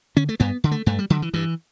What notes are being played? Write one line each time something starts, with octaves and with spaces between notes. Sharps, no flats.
D3 C#4
A3
G2 B3
D3
A3
G2 A3
G3
D3 F#3
E3
G2 E3